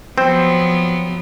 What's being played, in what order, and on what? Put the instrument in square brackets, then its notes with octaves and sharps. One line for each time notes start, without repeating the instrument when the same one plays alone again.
[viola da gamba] F3 F#3 B3 [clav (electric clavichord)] C4 C5